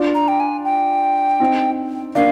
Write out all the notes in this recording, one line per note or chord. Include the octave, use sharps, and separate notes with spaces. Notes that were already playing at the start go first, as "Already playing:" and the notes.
Already playing: D4 F4
A#5
G5
G#5
G5
C4 D#4
A#3 D4 F5